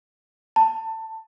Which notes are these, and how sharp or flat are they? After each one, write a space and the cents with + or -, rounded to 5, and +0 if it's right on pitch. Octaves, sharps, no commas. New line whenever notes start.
A5 +20